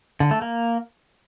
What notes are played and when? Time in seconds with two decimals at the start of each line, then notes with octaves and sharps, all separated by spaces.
0.20 D3
0.31 A3
0.42 A#3